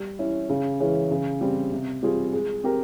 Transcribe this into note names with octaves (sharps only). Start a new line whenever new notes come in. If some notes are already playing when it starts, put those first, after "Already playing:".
Already playing: G3
C#4 E4
C#3
E3 G#3 C#4
C#3
G3 C4
C3
G3 C4 F4 G#4
G#3
C4 G4 A#4